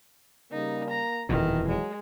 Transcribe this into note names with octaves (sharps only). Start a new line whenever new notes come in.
C#3 G3 A#3 D#4
A#5
D#1 F2 B2 D#3 E3
F#3 G#3